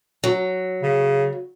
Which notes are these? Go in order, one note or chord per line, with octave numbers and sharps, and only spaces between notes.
F#3
C#3